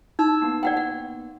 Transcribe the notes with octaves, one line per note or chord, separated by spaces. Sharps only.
D#4 A5 E6 G#6
A#3 B3
D5 F#5 G5
F#5